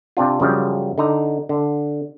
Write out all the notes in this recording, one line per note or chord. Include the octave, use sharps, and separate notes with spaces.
C3 C4 D4 F4
F#2 C#3 F3 G3
D3 D#4 A#5
D3